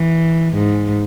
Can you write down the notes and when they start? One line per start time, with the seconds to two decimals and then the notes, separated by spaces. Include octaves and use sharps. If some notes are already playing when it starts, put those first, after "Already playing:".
Already playing: E3
0.54 G#2